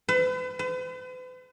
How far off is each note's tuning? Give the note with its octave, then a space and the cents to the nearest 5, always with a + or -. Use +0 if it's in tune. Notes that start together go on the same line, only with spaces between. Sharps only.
B4 +40
B4 +45